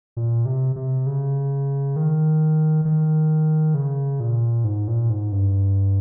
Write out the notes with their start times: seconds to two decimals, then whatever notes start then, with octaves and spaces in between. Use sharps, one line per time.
0.17 A#2
0.46 C3
0.76 C3
1.07 C#3
1.96 D#3
2.85 D#3
3.74 C#3
4.20 A#2
4.64 G#2
4.88 A#2
5.10 G#2
5.32 G2